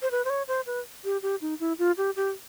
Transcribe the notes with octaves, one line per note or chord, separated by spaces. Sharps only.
C5
B4
C5
C#5
C5
B4
G4
G4
D#4
E4
F4
G4
G4